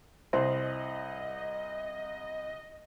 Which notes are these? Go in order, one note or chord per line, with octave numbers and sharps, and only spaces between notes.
C2 C5 D#5